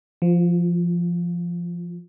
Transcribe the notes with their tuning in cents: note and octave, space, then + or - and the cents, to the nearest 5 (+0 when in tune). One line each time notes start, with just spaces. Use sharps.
F3 -15 F4 +25